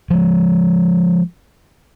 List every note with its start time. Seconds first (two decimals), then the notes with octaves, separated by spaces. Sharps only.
0.10 F3 G#3